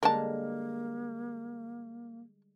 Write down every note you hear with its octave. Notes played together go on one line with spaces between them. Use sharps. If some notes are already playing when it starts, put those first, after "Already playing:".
D3 G3 G#3 A#3 A#4 A5